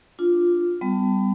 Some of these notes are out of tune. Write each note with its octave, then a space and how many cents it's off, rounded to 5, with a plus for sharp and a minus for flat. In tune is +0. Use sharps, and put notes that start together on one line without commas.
D4 +0 F4 +0
G3 +0 B3 +40 A5 +15